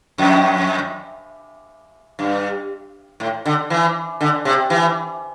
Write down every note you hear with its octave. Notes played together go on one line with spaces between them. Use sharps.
F2
G2
A2
D3
E3
D3
C3
E3